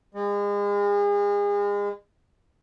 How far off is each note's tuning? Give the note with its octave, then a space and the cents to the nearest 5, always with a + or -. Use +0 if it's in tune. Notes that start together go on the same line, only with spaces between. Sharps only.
G#3 -35